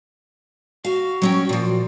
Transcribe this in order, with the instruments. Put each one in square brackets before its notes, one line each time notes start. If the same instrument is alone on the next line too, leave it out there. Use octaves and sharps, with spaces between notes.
[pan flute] F#4 [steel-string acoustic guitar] F5
[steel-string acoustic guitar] F#3 C#4 G5
A#2 F3